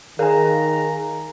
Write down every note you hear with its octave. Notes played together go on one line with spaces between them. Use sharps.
D#3 G#4 A#4 F5 G#5 A#5